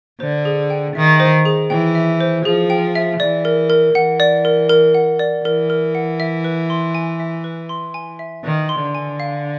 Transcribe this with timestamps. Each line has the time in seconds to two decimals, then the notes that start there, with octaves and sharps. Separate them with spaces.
0.20 D3 C5
0.45 G#4
0.70 G5
0.95 D#3 E5
1.20 C5
1.45 G#4
1.70 E3 G5
1.95 E5
2.20 C5
2.45 F3 G#4
2.70 G5
2.95 E5
3.20 E3 D5
3.45 A#4
3.70 A#4
3.95 E3 F#5
4.20 D5
4.45 A#4
4.69 A#4
4.94 F#5
5.19 D5
5.45 E3 A#4
5.70 A#4
5.95 F#5
6.20 E5
6.44 B4
6.70 C6
6.95 G#5
7.20 E5
7.44 B4
7.69 C6
7.94 G#5
8.19 E5
8.44 D#3 B4
8.69 C6
8.82 D3
8.95 G#5
9.20 F5